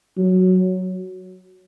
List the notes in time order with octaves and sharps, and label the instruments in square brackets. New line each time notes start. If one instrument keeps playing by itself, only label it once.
[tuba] F#3